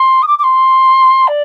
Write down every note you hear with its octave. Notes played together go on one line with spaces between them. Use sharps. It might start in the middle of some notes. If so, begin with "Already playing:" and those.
Already playing: C6
D#6
D6
D6
C6
D5